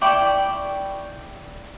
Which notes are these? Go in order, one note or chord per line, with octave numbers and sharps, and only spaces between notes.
E4 D5 G5 C#6